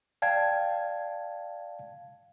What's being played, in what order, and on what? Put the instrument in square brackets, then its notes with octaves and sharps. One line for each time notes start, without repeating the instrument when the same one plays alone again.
[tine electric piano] D5 F5 G5 A5 G#6